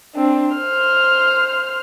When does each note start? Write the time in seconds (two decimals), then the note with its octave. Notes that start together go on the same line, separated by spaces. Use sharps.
0.15 C4 D4
0.54 C5 F6